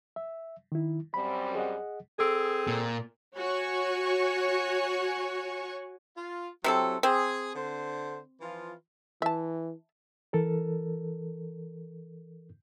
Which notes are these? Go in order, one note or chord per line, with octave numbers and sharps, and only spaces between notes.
E5
D#3 E4
F#2 G3 C4 B5
G#4 D#5 F#5
C4 G#4 A4 E6
A#2
F#4 C#5 G#5 C#6
F4
C3 F#3 C4 E4 A4
C4 G#4
D3 C5
E3 F3 F4
E3 E5 A5
E3 A4 A#4